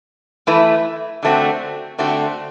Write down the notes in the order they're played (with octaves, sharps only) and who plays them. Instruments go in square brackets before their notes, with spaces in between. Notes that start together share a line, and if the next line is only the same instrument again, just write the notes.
[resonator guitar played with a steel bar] E3 A3 E4 B4
D3 A3 C4 F#4
D3 A3 C4 F#4